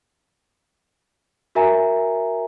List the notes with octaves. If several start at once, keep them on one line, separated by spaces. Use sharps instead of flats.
F#4 A#4 E5 G#5 A#5